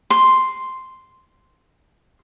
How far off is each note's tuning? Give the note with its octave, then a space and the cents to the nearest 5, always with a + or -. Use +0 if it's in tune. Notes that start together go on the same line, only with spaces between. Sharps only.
C6 +0